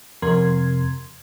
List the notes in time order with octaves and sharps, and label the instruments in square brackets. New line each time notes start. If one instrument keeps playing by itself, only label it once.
[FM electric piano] F2 C3 A#4 C6 G#6